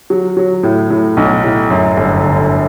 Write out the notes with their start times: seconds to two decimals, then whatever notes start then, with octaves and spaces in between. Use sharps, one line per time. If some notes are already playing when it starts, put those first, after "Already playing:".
0.10 F#3
0.37 F#3
0.63 A2
0.90 A2
1.17 B1
1.44 A2
1.70 F#2
1.97 G1
2.24 D3